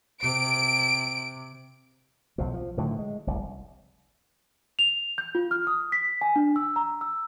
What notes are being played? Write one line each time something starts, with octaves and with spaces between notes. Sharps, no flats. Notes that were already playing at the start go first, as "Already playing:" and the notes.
C3 D7
B1 F3 F#3
F3
A2 D3 D#3 F#3
G#3
F1 C2
F7
G6
F4
F6
D#6
B6
G#5
D4
E6
A#5
E6